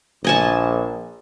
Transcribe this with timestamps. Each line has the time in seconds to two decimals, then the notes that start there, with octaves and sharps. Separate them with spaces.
0.24 A#1 D#5 G#5 A5